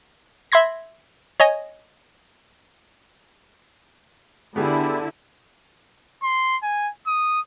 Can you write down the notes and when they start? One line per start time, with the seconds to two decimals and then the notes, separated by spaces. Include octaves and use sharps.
0.52 E5 B5 C6 G#6 A#6
1.40 C#5 D#5 G#5 A#6
4.56 D3 B3 E4 G4 G#4
6.23 C6
6.63 G#5
7.07 D#6